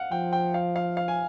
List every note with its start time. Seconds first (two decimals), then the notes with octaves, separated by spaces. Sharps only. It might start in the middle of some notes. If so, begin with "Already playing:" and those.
Already playing: F5 F#5
0.11 F3 G5
0.33 G5
0.54 F5
0.76 F5
0.97 F5
1.08 G#5